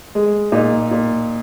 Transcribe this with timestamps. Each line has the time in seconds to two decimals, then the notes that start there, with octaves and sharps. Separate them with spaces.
0.15 G#3
0.52 A#2 D#4
0.91 A#2